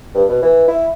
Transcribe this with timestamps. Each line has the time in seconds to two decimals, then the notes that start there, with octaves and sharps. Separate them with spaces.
0.15 G2
0.29 B2
0.43 E3
0.68 E4